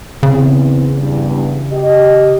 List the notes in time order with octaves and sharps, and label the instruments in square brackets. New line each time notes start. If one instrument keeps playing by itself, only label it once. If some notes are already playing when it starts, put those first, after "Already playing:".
[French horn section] E2 C4 [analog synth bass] C#3
[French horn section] E2 G2
G4 D#5